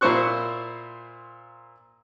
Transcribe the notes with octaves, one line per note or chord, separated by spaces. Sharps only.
A#2 A#3 E4 C5 C#6 F#6